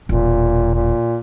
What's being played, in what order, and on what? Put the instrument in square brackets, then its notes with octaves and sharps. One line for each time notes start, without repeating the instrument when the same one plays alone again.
[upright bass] E1 F4 [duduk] A#2
[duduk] A#2